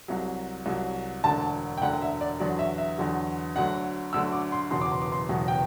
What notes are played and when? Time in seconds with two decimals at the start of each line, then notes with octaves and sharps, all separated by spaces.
0.08 C2 C3 F#3
0.66 C2 C3 F#3
1.24 E1 D2 D3 A5
1.78 G5
1.82 E1 D2 D3 F#5
2.02 E5
2.21 D5
2.40 E2 D3 F#3 D5
2.59 E5
2.78 E5
2.98 E2 D3 F#3
3.56 D2 D3 F#3 F#5
4.13 D2 D3 F#3 E6
4.32 D6
4.52 C6
4.71 F#1 E2 B2 F#3 C6
4.81 D6
4.92 C6
5.02 D6
5.12 C6
5.29 F#1 E2 B2 F#3
5.48 G5